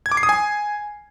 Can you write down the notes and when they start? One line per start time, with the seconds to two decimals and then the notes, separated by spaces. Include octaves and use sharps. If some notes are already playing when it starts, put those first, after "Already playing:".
0.06 G#6
0.12 D6
0.17 C7
0.23 D#6
0.29 G#5